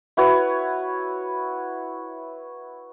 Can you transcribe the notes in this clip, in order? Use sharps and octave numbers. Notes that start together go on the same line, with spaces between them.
E4 F#4 B4 C#5